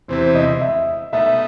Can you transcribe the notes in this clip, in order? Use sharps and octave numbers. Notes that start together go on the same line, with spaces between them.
E2 C3 E3 C5
D#5
E5
B2 A3 D#4 E5